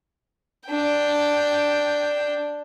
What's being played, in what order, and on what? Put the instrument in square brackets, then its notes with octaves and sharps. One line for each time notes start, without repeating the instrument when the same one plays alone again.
[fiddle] D4 G5